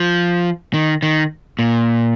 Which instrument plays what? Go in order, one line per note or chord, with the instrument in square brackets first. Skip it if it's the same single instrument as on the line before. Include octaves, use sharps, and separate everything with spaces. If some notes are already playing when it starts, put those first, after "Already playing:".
Already playing: [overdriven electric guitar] F3
D#3
D#3
A#2